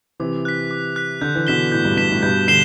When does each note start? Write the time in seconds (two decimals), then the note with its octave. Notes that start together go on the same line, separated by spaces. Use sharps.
0.20 C3 E3 D6
0.45 F#6 B6
0.71 D6
0.96 F#6 B6
1.21 D3 G6
1.35 E3
1.47 B2 D3 B6 E7 G7
1.72 A2 G6
1.85 G2
1.97 G2 B6 E7 G7
2.10 A2
2.22 G2 B2 G6
2.48 B2 D3 C7 E7 G7